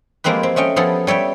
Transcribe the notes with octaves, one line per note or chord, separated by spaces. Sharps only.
F3 G#3 A#3 C4 G4 B4
C4
A3 C#4 D#5 G5
F3 B3 G#4 A4
G3 C#5 E5 G5